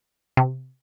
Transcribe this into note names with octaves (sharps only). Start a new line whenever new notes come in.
C3